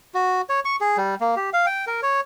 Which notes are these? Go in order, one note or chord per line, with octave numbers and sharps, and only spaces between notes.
F#4
C#5
C#6
G#4
G3
A#3
G4
F5
G5
A#4
C#5